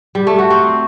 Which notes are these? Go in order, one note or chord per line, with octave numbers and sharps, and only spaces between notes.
G3
A3
F#4
C4